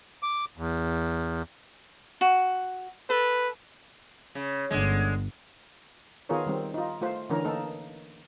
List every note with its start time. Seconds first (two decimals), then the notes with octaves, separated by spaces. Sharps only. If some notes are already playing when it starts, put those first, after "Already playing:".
0.23 D6
0.57 E2
2.21 F#4
3.10 A4 B4
4.35 C#3
4.71 G1 D3 G#3
6.29 D#3 B3 F4 G#4 A#4 C#5
6.46 D#3 G3 C4
6.74 D#4 F4
7.01 A3 F4 C5
7.30 D3 E3 C#4 A#4
7.45 A#3 D#4 A4